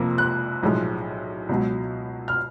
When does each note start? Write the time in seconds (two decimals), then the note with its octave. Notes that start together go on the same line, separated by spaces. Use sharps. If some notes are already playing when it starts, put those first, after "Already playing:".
Already playing: F2 C3 F3 A#3
0.18 F#6
0.63 B1 A2 F3 G#3
1.49 C#2 B2 F#3
2.28 F6